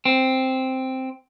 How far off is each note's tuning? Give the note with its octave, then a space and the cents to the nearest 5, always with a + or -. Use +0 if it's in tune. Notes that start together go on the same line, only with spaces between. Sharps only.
C4 +0